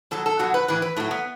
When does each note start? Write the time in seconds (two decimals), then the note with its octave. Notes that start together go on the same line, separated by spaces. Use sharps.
0.11 B2 F#3 A4
0.26 A4
0.39 B2 F#3 F#4
0.54 B4
0.68 A2 E3 B4
0.82 B4
0.96 A2 F#3 A3
1.11 B3